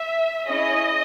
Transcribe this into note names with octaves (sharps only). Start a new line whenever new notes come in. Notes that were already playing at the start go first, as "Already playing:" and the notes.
Already playing: E5
C#4 E4 G#4 D#5